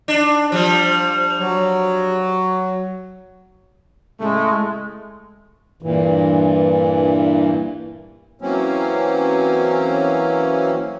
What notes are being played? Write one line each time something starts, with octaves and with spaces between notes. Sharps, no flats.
D4
F3 G3
F#3
A2 C#3 G#3 A3
G2 A#2 E3
E3 F#3 A#3 C4 C#4